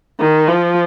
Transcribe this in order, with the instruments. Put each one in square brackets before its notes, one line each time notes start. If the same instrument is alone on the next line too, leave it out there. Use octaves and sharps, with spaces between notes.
[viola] D#3
F3